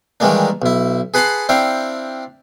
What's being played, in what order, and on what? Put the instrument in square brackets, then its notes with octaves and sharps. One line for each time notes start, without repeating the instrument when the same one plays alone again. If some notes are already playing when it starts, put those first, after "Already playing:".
[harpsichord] D#3 E3 G3 G#3 A#3 D4
B1 E4
G#4 B4 F#5 A5 B5 C6
C4 D4 E4 F5 G5